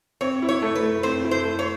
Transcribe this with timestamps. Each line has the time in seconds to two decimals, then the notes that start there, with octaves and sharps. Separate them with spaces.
0.21 C4 C#5
0.42 E4
0.49 C#5
0.62 A3
0.75 B4
0.83 A3
1.03 C4 C5
1.24 E4
1.31 C5
1.45 A3
1.59 C#5